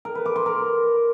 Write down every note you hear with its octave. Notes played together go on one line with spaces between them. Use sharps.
A#4
B4
D6
C6
A#4